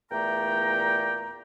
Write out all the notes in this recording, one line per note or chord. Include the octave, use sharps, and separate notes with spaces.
E2 A#2 A3 D5 G5 A#5